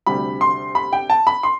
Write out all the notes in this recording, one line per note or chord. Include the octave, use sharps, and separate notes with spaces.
D2 C3 G3 B5
C6
B5
G5
A5
B5
C6